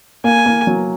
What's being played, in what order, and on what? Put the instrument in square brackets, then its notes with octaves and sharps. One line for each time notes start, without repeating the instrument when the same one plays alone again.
[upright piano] A#3 [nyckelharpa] G#5
[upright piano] A#3
F#3